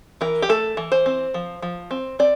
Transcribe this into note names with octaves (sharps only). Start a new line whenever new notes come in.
E3 A#4
G4
A3 A4
E3
C5
C4
F3
F3
C4
C4 D5